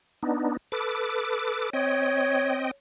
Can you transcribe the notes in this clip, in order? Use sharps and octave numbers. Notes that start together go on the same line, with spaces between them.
B3 D4 D#4
A4 B4 D6
C4 C#5 D#5 G5